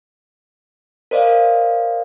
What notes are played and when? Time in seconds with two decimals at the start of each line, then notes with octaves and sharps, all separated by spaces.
1.11 A#4 C5 D5 D#5 F5